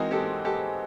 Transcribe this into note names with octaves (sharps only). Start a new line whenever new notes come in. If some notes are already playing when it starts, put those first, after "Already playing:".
Already playing: E3 G#3 C4 D#4 F#4 G#4 A#4
G4 A4
G4 A4